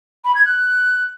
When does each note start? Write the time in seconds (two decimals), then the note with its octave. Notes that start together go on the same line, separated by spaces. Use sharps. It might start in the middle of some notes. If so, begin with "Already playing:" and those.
0.24 B5
0.35 G#6
0.45 F#6